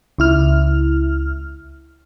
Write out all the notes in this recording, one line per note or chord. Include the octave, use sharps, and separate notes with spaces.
C#2 E4 F6